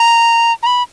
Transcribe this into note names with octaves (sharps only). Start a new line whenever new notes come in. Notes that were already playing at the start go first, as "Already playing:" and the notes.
Already playing: A#5
A#5
B5